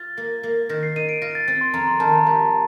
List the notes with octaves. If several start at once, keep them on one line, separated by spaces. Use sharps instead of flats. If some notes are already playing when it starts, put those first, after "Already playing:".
Already playing: F4 A6
A#3
A#3
D#3 A#6
C7
D#4 D#7
D7
F4 A#6
A6
C4 A6
C6
F2 A#5
C6
D#3 A5
A#5
G3